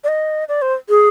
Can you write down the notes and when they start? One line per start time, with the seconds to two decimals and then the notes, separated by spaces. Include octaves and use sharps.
0.04 D5
0.08 D#5
0.49 D5
0.62 C5
0.89 G#4